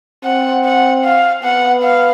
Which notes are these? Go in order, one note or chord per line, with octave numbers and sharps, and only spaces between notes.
C4 F#5
F#5
F5
B3 F#5
F5